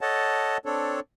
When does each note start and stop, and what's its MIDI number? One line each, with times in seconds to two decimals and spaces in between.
0.01 0.57 69
0.01 0.57 73
0.01 0.57 75
0.01 0.57 78
0.01 0.57 81
0.66 1.00 60
0.66 1.00 62
0.66 1.00 69
0.66 1.00 73